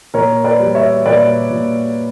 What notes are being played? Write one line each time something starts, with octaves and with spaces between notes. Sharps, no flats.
A#2 A#4 C#5
B4 D5
G3
C#5 E5
A#2 B4 D5
A#2